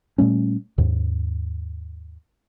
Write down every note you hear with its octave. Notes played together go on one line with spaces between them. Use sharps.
A#2 G3 A3 C#4
D#2 G#2